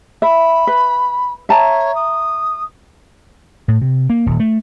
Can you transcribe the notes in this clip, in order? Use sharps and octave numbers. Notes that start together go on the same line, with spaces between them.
E5 B5
B4
C#5 E5 A5 A#5
D#6
A2
C3
A#3
D#1
A3